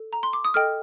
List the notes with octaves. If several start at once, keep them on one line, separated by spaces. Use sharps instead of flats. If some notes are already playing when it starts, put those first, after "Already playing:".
Already playing: A4
A#5
C6
D6
D#6
A4 D#5 G5 F6